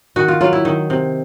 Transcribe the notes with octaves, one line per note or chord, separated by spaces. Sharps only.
D#3 F#4
F4
F#3 F4
E4
D#3
C3